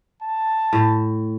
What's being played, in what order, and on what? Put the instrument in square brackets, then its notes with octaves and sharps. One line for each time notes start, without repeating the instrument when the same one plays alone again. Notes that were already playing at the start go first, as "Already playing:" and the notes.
[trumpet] A5
[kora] A2